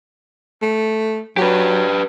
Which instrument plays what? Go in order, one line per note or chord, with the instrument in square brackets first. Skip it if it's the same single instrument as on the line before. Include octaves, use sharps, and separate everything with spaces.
[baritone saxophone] A3
[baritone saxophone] F#3 [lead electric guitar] G4 B4